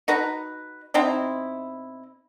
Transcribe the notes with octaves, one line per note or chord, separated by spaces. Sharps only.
D#4 F#4 B4 A#5
B2 C4 D#4 E4